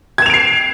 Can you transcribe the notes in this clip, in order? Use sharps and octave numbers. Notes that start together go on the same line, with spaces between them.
G#6 C7 D7 E7 F7